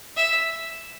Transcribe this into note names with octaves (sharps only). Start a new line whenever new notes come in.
E5